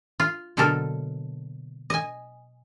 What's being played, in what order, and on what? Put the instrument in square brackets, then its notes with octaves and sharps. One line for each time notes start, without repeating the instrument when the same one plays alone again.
[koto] F4
B2 D3 F#3 A#3 A4 A#4
D#5 G#5